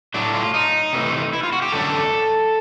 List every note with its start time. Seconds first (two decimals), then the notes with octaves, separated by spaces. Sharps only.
0.14 A2 F#3 A3 D4
0.34 F4
0.54 D#4
0.93 C3 E3 A3
1.33 E4
1.43 F4
1.53 F#4
1.62 G4
1.72 F#2 D3 F#3 A3 A4